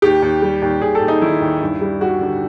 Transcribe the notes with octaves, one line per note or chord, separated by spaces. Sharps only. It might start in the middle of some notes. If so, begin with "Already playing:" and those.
D#2 G4
D#2
G3
D#2
D#2 G#4
A4
D#2
D#4
D#3 E4
D#2
G2
G3
G3 F#4
D3